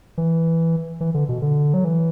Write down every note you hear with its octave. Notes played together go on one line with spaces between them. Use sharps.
E3
E3
D3
B2
D3
F#3
E3